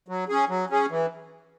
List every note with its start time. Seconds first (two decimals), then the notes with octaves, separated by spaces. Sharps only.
0.08 F#3
0.29 C#4 G#4
0.49 F#3
0.70 C#4 G#4
0.90 E3